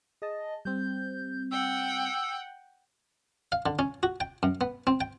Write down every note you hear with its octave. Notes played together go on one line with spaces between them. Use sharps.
G#4 D#5 A5
G3 C4 G6
F#5 G5 E6
F5
D3
C#4
F#4
G5
F#2
B3
C4
G5